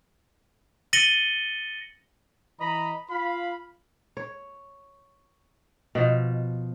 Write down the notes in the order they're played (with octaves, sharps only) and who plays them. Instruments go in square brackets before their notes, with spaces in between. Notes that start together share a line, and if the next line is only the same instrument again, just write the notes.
[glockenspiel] A6 A#6 C#7 D#7 F#7 G7
[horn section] E3 D#5 A#5 B5
F4 F5 B5
[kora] C#5
B2 F3